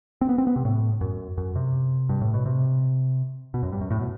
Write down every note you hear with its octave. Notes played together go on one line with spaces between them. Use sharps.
C4
B3
C4
B3
C3
A2
F#2
F#2
C3
G2
A2
B2
C3
B2
F#2
G2
F#2
A2
B2